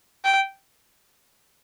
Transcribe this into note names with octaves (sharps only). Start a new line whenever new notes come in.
G5